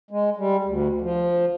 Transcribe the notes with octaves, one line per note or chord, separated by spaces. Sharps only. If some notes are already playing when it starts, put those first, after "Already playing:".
G#3
G3
D2
F3